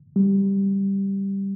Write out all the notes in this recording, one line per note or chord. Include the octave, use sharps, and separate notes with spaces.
G3